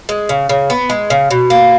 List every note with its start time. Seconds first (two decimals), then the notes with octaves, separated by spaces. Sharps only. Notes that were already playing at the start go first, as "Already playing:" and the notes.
0.09 G#3
0.29 C#3
0.49 C#3
0.70 B3
0.90 G#3
1.10 C#3
1.31 B2
1.50 A#3